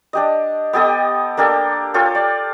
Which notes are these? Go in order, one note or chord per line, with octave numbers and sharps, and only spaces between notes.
D4 G4 D#5
B3 G4 A4 D#5
A#3 D4 G4 A4
F4 G4 A4 C#5
D5